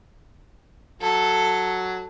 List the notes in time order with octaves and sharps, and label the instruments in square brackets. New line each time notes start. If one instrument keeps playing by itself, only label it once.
[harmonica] F#3 [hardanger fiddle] A4